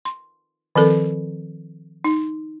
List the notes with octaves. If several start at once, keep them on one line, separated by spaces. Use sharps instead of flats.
C6
D#3 F3 C4 A4 A#4
D#4